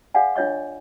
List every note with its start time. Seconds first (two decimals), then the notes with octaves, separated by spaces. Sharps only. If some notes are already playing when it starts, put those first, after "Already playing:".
0.14 G#4 D5 F5 F#5 G#5
0.36 D4 F4 C#5 D#5 C#6